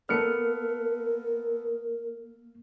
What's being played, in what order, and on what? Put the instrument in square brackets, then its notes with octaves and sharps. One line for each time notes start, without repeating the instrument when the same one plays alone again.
[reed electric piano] A#3 F6 [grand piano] B3 A4 C#7 [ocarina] A#4